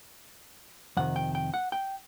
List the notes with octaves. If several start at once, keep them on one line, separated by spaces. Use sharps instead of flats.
F2 C3 D#3 F#5
G5
G5
F#5
G5